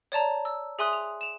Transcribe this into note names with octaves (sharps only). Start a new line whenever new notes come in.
C#5 D5 A5 A#5
E6
G#4 E5 G#5 C6 D#6 F#6
F7
E7 F7